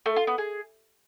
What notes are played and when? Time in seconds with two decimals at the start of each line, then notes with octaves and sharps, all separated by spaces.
0.06 A3
0.16 F4
0.27 B3
0.38 G#4